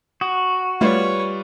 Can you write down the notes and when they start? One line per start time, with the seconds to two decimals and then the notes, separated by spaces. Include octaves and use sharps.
0.21 F#4 D#6
0.81 G3 A3 F4 B4 C#5